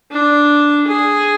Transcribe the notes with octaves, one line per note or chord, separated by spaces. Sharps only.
D4
G#4